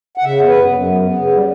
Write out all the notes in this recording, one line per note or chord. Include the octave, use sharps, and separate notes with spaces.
F#5
C#3 E5
B3
B4
F#2
F#2
B3
B3
C#3
G3